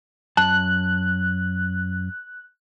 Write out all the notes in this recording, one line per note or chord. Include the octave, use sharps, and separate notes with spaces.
F#2 A5 F#6